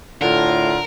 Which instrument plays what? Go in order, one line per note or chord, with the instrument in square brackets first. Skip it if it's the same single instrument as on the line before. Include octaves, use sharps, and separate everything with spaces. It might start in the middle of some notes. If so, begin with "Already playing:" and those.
[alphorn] A2 [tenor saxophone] D3 [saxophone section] F4 [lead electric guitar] A#4